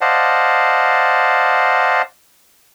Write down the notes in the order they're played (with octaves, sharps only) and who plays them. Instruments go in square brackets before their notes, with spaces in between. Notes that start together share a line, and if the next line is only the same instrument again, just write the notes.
[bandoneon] C5 D5 D#5 F5 F#5 A5